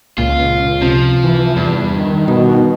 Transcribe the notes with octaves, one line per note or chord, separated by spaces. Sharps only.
C#2 A#2 F4
C3 F3
E3
E2 G2
D#3
B2 D#4